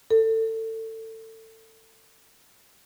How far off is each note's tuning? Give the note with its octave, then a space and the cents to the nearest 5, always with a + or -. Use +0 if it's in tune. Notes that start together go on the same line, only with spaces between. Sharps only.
A4 +25